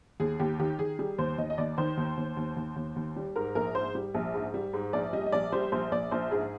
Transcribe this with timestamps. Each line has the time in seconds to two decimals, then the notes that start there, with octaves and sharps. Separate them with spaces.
0.20 D#2 G#4
0.40 D#2 G4
0.59 D#3 G4
0.79 D#3 G#4
0.99 G3 G#4
1.18 D#2 C5
1.38 D#2 D#5
1.50 D#5
1.58 D#2 D5
1.78 D#3 C5
1.97 D#2
2.17 D#2
2.37 D#2
2.57 D#2
2.76 D#2
2.96 D#2
3.16 G3
3.36 G#2 A#4
3.55 A#1 A#4
3.75 G#2 C5
3.95 G3
4.14 A#1
4.34 G#2
4.54 G3
4.73 G#2
4.93 A#1 D5
5.13 G3 D#5
5.26 D#5
5.32 A#1 D5
5.52 G3 C5
5.72 A#1 C5
5.92 A#1 D5
6.11 A#1 C5
6.31 G#2 G#4